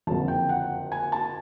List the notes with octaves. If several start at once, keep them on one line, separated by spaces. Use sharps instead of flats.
F#1 F2 D3 A5
G5
F#5
G#5
A5